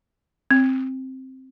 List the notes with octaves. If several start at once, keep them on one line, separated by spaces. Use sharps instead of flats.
C4